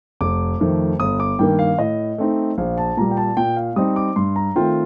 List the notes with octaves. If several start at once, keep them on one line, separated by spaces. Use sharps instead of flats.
F1 D6
F2 D#3 A3
G1 D#6
D6
G2 D#3 A#3 G5
F5
A2 D#5
A3 C4 D#4
A#1 F5
A5
A#2 G3 A#5
G5
A5
A#2 G5
F5
G3 C4 D#4 D#6
D6
G2 C6
A#5
D#3 A3 C4 F4 G5